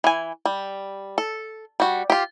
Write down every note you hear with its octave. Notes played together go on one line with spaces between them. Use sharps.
E3 G#5
G3
A4
G3 F#4
F4 G4